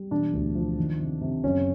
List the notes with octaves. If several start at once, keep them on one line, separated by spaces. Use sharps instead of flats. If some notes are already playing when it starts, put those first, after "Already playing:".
Already playing: G3
E1 D4
D2
F3
D#3
C3
C3
F#1 C#4